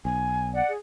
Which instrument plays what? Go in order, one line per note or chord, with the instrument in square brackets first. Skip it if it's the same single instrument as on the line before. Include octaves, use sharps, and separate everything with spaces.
[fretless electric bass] B1 [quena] G#5
[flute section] D5 F#5
[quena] G#4